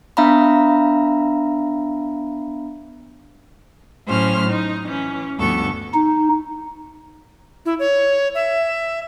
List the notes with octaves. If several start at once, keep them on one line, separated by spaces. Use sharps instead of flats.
B3 D4 E5 F5 A#5 B5
A2 F#3 C#4 C5 F6
D#4
E3 C#4
D2 G2 F3 B3 A4 C#6
D#4
E4
C#5
E5